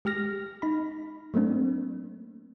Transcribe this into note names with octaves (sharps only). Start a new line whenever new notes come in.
G#3 G4 F6 A#6
D#4 B5
F#3 A3 A#3 C4 D4